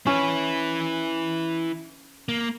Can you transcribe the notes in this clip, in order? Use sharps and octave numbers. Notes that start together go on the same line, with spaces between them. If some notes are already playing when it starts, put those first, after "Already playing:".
C#4 E4 B4
A#3